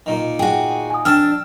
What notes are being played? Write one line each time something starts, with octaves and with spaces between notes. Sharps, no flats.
A#2 D#3
F#4 G#4 G5
G#5 D#6
F2 D4 G5 A5 E6 F6